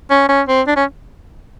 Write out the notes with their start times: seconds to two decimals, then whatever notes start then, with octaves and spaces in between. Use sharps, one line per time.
0.10 C#4
0.29 C#4
0.48 C4
0.67 D4
0.76 C#4